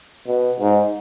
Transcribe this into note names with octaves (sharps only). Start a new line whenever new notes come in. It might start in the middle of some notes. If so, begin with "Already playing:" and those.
B2
G#2